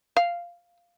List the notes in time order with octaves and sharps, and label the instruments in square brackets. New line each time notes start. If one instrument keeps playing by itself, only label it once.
[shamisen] F5